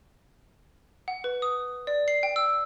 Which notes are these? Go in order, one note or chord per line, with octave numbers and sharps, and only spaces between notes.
F#5
B4
D#6
D5
C7
G5
E6